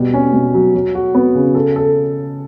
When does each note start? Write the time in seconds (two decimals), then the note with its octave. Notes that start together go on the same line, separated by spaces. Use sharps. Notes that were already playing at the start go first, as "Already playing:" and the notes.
Already playing: B2 G3
0.14 C#4
0.33 B2
0.54 F#3
0.75 F#3
0.95 F#4
1.15 B3
1.35 C#3
1.55 A4
1.76 A4